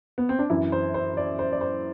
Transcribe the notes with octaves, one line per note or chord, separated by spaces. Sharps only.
B3
C4
D4
F#2 E3 E4
C5
C5
D5
C5
D5
C5